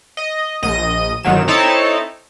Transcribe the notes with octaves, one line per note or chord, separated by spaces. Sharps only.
D#5
A#1 D#5 D#7
G1 D#3 F#3 E7
C4 D#4 E4 A4 C#5 A5